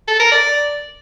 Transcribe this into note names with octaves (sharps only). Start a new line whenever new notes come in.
A4
A#4
D5